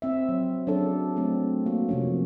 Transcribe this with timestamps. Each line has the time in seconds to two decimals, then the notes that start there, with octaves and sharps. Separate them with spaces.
0.02 C4 E5
0.29 F#3
0.67 F#3 C#4 D4 G#4 A4
1.16 F#3 A3 C4
1.66 A#3 F#4
1.89 C3 F3 C#4